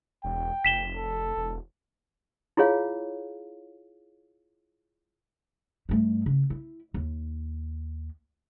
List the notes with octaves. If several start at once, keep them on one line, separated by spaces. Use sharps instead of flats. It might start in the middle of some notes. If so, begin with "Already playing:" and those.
E1 G5
F1 B6 E7 G7
A4
E1
E4 F4 G#4 C#5 F5
G2 A3
C#3
E4
D#2